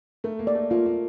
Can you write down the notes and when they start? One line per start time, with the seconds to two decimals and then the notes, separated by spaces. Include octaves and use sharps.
0.24 A3 A#4
0.39 A#3
0.47 D5
0.55 A3
0.70 A#3 F4
0.86 A#3